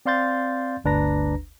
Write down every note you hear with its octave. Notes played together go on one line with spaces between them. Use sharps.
C4 D5 F5 C6 G6 A6
G1 D2 D4 B4 A#5 A#6